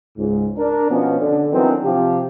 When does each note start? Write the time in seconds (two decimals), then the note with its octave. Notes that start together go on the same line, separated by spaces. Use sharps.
0.18 C#2 G#2
0.58 D4 A#4
0.90 B2 F3 B3 C#4
1.20 D3
1.52 D#3 E3 F#3 B3 C4 D4
1.84 C3 F3 G4